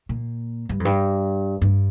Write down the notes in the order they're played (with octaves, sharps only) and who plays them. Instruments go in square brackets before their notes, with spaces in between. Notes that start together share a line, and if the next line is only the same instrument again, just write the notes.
[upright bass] A#2
G2
F2
G2
G2